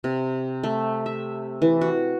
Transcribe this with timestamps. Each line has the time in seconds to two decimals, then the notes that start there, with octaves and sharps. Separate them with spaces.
0.04 C3
0.64 A3
1.06 E5
1.62 E3
1.81 F#4